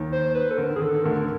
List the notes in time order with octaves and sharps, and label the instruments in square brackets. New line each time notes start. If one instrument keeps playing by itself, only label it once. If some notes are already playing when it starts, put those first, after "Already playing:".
Already playing: [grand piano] D#2 D#3
[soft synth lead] C5
B4
A4
[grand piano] D3 [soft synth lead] A#4
[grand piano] D#3
[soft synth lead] G#4
[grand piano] D3 [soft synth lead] A4
[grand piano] D#3
[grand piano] D2 D3 [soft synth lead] A#4
[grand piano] D3